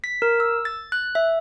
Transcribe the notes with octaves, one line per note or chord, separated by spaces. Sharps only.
B6
A#4
E6
A6
F#6
E5